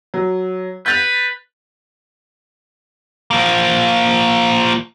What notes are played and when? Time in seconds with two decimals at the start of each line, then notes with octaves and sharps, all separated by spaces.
0.14 F#3
0.86 B4 G6 A6 F7
3.31 F3 A#3